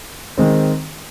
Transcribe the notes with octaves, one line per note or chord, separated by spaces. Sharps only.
D#3 G#3 C4